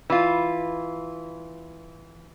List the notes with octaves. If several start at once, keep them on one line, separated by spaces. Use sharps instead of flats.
E3 F4